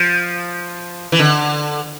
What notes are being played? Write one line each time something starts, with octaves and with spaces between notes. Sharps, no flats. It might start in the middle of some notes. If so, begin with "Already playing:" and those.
Already playing: F3
E3
D3